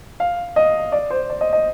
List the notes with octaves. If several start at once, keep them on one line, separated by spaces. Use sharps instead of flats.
F5
D#5
D5
C5
D5
D#5
D#5